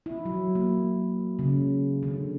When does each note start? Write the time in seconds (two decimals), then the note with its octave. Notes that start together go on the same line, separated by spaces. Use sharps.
0.06 E4
0.25 F#3
0.55 A#3
1.39 C#3
2.03 D3